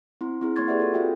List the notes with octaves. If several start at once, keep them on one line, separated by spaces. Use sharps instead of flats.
C4 E4 C6
C4 E4 G#4
A#3 C#5 C6 C#6 G#6 A6
G4 G#4 B4 D5 E5 F#5
F4 A4
C4 F4 F#4 E5 G5